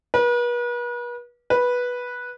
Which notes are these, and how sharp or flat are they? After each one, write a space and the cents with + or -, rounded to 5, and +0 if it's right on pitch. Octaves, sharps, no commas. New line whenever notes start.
B4 -40
B4 -10